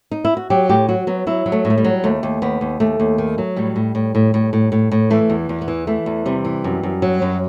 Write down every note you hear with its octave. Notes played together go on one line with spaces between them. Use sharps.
D#4
E4
F#4
F#3 G4
A2 G4
F#3 F#4
F#3 B3
F#3 E4
F#3
A3
A2
A3
G3
F#3
D#2 A3
D#2
D#2 B3
D#2
D#2 A3
D#2
D#3
F#3
A2 G3
A2
A2
A2
A2
A2
A2
A2
E3 A3
E2
E2
B3
E3
E3 A3
E2
C3 G3
E3
F#2
F#2
F#3
F#2